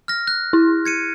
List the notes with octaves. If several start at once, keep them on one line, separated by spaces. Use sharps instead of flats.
F6 A#6
F#6
E4
G#6 C#7 D#7